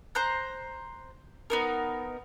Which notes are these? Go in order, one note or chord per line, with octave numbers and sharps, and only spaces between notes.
C5 A#5 F#6 G6
B3 D#4 A#4